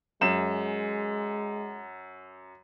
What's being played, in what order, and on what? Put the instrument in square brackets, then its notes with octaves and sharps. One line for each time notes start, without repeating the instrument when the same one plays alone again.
[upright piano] F#2 E7 [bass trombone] G#3